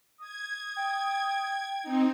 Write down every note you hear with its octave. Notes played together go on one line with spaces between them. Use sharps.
D#6 G#6
G5
C4 D#4